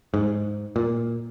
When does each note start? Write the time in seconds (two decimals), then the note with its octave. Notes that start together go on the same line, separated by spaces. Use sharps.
0.14 G#2
0.76 A#2